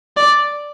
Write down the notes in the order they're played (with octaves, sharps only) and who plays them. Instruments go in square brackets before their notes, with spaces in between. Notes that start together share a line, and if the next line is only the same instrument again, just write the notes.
[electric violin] D5